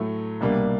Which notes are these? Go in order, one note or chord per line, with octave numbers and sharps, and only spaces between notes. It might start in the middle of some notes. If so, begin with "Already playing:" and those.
Already playing: A2 F#3 A3
C2 B2 G3 A#3 D4